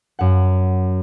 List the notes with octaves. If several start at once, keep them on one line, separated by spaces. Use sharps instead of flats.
F#2 F#5